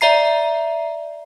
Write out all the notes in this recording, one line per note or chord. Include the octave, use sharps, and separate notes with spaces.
D5 E5 A#5 C7